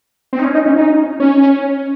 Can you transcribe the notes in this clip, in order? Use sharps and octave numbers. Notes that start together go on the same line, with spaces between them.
C4
D#4
C#4
D#4
C#4
D#4
C#4